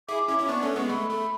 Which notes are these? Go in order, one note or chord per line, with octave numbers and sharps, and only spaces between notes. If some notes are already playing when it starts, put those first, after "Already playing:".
E4 G#4 D6
C#4 E4
C#4 E4
B3 D4 C#6
A3 C#4
G#3 B3 C#6
A3 B5
A3